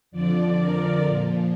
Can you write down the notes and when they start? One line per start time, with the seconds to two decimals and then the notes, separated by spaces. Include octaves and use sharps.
0.11 F2 D3 F3 D5
0.58 A#4
1.04 A#2 F3